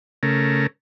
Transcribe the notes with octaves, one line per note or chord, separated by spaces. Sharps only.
C#3 A3 A#4